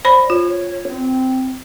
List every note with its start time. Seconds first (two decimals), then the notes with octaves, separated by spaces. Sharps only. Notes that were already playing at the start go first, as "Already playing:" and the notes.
0.05 C5 D5 B5
0.30 F4 C#5
0.88 C4